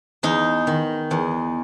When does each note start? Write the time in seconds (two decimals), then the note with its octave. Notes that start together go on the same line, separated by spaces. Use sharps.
0.23 E2 D#4
0.67 D#3
1.11 E2